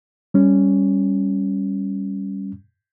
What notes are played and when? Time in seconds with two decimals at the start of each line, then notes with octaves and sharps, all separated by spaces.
0.34 G3 C#4